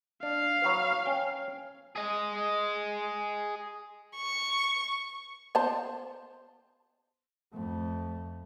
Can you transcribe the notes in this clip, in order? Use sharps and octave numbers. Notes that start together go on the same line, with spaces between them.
D4 F5
F#3 F#4 B4
C#4 G5
G#4 D#5
C#6
B3 C5 A5
F2 A3